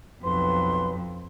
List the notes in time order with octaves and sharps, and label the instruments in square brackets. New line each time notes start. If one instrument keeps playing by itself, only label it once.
[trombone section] B1 B4 [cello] F2 [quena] C6